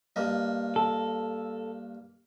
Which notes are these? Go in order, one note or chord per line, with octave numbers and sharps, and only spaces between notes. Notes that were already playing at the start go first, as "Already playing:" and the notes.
G2 A#3 D#5
A4